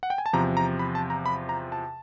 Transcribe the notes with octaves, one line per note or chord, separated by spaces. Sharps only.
F#5
G5
G#5
A5
E2 C3 F3 A#5
A#5
B5
A5
A#5
B5
A#5
A5